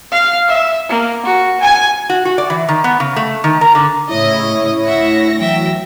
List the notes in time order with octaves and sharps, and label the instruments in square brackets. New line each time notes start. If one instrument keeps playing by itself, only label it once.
[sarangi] F5
E5
A#3
F#4
G#5
[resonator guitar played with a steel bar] F#4
F#4
D5
E3
D#3
B3
C#3
A3
D#3
A#4
D3
[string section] A2 C#3 [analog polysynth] E4 C#5 [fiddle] D#5 D#6
[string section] D2 A#6 [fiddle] E5 F#5
[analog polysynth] E3 F#3 [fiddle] E5 G5